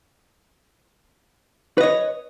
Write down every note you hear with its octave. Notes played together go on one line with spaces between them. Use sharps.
B4 C#5 D#5